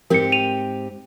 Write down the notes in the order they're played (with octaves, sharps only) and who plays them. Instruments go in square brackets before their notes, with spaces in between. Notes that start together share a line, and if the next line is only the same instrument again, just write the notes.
[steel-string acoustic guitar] G#2 C4 G4 [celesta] A#4 C#7
[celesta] D#7 F7